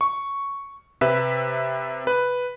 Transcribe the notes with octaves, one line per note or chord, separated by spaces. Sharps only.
C#6
C3 B4 E5 B6
B4